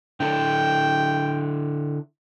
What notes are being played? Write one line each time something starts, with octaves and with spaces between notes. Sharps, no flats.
D3 E4 A4 G5